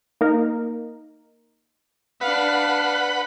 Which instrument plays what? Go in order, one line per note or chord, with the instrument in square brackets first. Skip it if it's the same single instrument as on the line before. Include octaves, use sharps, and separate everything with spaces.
[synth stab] A#3 D#4 A#4
[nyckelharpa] D4 F5 [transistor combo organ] B4 F#5 B5